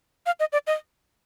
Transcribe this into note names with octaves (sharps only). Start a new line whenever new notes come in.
F5
D#5
D5
D#5